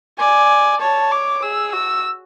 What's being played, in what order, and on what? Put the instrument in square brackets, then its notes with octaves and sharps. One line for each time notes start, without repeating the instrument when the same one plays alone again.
[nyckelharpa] D5 [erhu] G#5
[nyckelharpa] C#5 [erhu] A5
[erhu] D6
[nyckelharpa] G#4 [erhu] E6
[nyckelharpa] F#4 [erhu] E6